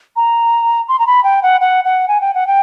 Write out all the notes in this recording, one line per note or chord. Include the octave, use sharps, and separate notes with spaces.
A#5
C6
A#5
B5
G5
F#5
F#5
F#5
G#5
G5
F#5
G5